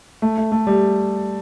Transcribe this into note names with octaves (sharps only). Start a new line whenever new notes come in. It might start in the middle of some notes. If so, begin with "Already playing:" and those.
A3
A3
A3
G3